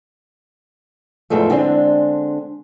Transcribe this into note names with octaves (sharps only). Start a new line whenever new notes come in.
E2 G#2 F3 G#3 A3
D3 G#3 C4 D4